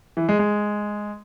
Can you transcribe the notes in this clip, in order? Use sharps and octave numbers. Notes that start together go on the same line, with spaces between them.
E3
G#3
G#3